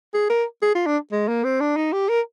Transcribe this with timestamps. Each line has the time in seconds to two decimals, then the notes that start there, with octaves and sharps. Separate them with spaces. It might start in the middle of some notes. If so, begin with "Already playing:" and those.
0.14 G#4
0.30 A#4
0.62 G#4
0.75 F4
0.87 D4
1.12 G#3
1.28 A#3
1.44 C4
1.61 D4
1.77 D#4
1.93 G4
2.09 A#4